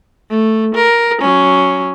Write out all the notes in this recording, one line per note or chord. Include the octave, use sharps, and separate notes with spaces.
A3
A#4
F#3 C#4